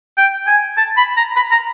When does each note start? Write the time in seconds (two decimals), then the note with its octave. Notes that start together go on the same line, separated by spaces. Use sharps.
0.17 G5
0.47 G#5
0.77 A5
0.97 B5
1.17 A#5
1.36 B5
1.51 A#5